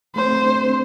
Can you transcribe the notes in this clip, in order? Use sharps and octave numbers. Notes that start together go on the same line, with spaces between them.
A3 C5
C4
A3
D4
C4